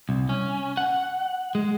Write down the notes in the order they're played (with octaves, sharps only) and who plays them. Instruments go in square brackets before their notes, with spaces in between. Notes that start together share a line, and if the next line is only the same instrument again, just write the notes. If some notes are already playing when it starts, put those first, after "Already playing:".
[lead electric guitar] C2
C#4
F#5
G#3